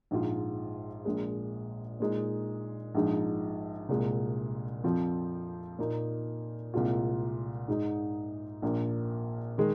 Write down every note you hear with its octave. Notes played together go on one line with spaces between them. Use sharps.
A#1 G#2 G#3 F4
A#1 A#2 G#3
A#2 G#3 D#4
A#1 G#2 F3 G#3 D#4
C2 A#2 G#3
F2 F3 C4 F4
A#2 A#3 D#4
C2 A#2 G#3 F4
G#2 G#3 D#4
A#1 A#2 A#3
D#3 G#3